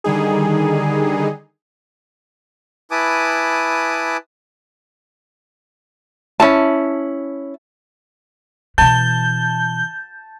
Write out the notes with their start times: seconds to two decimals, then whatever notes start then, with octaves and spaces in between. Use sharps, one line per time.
0.04 D3 D#3 G3 D#4 G#4
2.91 E4 B4 G#5 A5 D6 D#6
6.40 C#4 E4 A5
8.78 B2 E3 A5 G6